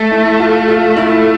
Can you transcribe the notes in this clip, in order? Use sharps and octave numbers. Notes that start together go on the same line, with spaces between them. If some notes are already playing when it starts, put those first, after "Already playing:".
Already playing: A3
E4
F4
F4
E4